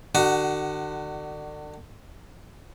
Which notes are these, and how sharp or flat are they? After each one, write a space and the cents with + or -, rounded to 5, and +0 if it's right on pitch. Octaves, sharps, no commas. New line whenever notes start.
D3 +35 F#4 +35 F#5 +0